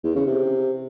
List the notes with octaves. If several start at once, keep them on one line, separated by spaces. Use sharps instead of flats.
E2
C#3
C3